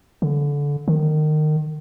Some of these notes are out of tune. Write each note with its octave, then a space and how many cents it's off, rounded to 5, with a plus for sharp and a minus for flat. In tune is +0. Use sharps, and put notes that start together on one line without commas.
D3 -25
D#3 -25